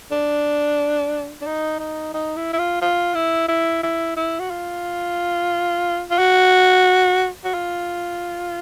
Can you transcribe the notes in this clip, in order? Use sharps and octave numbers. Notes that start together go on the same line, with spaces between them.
D4
D4
D#4
D#4
D#4
E4
E4
F4
F4
E4
E4
E4
E4
F#4
F4
F4
F#4
F#4
F4